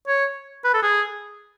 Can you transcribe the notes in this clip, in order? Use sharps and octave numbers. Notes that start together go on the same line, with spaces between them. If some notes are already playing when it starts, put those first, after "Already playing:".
C#5
B4
A4
G#4